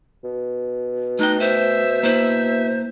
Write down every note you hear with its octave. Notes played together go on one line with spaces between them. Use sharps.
B2
A3 D#4 G5 F#6
C5 E5
A#3 E4 C5